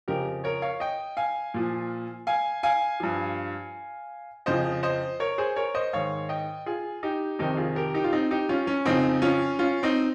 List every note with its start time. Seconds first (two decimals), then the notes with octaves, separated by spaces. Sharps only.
0.08 F2 C#3 F3 G4 A#4
0.44 A#4 C#5
0.62 C#5 F5
0.80 D#5 G5
1.17 F5 G#5
1.54 A#2 F3
2.27 F5 G#5
2.63 F5 G#5
3.00 G2 F3
4.46 F2 C#3 F3 C5 D#5
4.83 C5 D#5
5.20 A#4 C#5
5.38 G#4 C5
5.56 A#4 C#5
5.75 C5 D#5
5.93 G#2 D#3 C#5 F5
6.29 D#5 G5
6.66 F4 G#4
7.03 D#4 G4
7.39 F2 C3 D#3 D#4 G4
7.57 F4 G#4
7.76 G4 A#4
7.94 D#4 G4
8.04 F4
8.13 C4 D#4
8.31 D#4 G4
8.49 C#4 F4
8.67 C#4
8.86 F2 C#3 F3 C4 D#4
9.22 C#4 F4
9.59 C#4 F4
9.83 C4 D#4